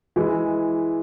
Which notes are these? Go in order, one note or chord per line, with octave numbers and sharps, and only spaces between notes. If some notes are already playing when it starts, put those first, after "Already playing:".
E3 G#3